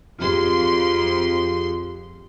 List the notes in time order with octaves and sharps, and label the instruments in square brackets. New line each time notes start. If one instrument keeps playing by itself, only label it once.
[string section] F2 C6 [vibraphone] F4 G4 G#4